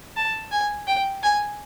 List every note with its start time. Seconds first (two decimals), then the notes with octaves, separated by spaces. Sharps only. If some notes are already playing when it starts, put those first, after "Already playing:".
0.16 A5
0.52 G#5
0.87 G5
1.23 G#5